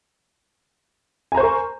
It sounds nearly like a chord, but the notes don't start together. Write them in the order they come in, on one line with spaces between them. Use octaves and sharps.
G#5 A#5 C5 C#6 A#4